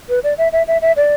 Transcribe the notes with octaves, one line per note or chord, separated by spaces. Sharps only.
B4
D5
E5
E5
E5
E5
D5